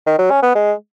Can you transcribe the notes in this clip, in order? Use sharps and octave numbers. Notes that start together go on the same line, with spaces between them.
D#3
F#3
C#4
B3
G#3